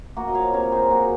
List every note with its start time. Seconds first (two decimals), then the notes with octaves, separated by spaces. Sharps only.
0.17 A#3 F#4
0.27 D#5
0.35 F3 C#5 F5
0.53 C3 A#4 C#5
0.72 D#4 G#4 C5
0.90 A#3 F#4 A#4